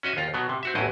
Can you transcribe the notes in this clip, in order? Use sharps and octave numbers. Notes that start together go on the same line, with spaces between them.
C#4 F#4 D#5 E5
D#2 F4 A#5
B2 F#3 B3
C3
C4 F#4 E5
A1 E2 A2 F#3 E4 D#5